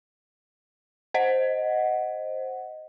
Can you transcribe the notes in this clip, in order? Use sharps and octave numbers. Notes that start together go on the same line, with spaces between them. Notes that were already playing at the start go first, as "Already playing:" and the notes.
C5 D#5 F#5